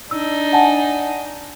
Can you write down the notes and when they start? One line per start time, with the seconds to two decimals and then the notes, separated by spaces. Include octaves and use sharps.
0.11 D4 D#4 E6
0.53 F#5 G#5 A5